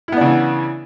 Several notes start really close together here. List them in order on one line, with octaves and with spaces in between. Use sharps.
E4 B3 D4 C#3 E3